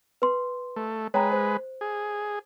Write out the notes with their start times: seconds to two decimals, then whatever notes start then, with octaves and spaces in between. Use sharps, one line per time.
0.22 B4 C6
0.76 A3
1.14 G#3 B4 C#5 G5 A#5
1.32 C5
1.81 G#4